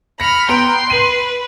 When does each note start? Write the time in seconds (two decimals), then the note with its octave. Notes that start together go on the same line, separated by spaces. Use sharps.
0.20 B5 F6 A#6 C#7
0.49 B3 G5 A#5 C6 D7
0.90 B4 D#7 F#7